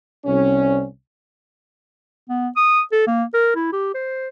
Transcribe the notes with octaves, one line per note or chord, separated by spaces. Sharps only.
C2 C#4
B3
D#6
A4
A#3
A#4
E4
G4
C5